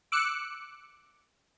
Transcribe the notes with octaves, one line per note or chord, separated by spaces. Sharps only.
D6 E6 F#6 C#7